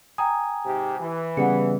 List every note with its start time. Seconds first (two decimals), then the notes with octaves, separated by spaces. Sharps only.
0.18 G5 G#5 A#5 D#6
0.65 G#2 C3 G4
1.00 E3
1.37 C#3 G3 B3 F#5 C#7